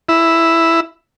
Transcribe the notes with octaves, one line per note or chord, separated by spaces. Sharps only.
E4